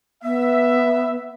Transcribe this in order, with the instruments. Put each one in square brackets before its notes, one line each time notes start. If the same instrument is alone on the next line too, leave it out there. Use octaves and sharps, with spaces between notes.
[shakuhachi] B3 [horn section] E5